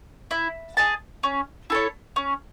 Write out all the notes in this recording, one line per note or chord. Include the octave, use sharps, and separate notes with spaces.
E4
G#4 D#5 A5
C#4
E4 A4 C#5
C#4